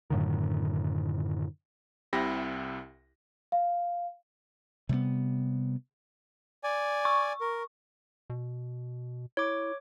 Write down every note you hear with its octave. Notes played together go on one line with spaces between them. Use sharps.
F#2 A2 D3 D#3
C2 C3 E4 G4 B5 A#6
F5
C3 G3 A3 B3
D5 G#5
C#6
A#4
B2
E4 C#5 D6